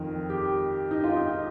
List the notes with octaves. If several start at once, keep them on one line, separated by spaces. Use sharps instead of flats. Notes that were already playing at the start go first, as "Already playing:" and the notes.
Already playing: F2 D#3 A#4
G4
D#4
F4
D#4